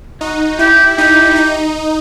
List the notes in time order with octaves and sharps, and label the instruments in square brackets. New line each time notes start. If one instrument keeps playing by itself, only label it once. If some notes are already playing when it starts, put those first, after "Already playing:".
[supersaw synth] D#4 [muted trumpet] F#4
[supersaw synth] E4 [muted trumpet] G4
[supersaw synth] D#4 [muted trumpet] G4
[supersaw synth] D#4